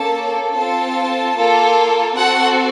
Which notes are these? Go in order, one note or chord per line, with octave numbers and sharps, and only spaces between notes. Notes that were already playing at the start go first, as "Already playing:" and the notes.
Already playing: A#3 C#4 A4 A5
C4 F4 A4 A5
A#3 F4 A4
C4 F#4 A4 F#5